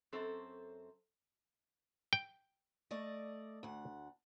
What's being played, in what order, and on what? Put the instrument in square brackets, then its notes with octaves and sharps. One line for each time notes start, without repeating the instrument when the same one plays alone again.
[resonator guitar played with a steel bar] F#2 C4 A4 C5
[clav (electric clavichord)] G5
[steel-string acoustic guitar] A3 D5 D#5
D2 F#5